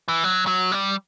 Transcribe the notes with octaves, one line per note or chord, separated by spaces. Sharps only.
E3
F#3
F#3
G3